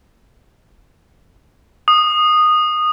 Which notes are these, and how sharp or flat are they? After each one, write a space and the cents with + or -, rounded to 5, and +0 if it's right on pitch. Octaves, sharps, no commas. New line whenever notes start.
D#6 -15